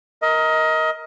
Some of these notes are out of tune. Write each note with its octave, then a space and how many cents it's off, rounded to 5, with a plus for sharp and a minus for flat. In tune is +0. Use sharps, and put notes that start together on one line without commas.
A#4 +0 D#5 +25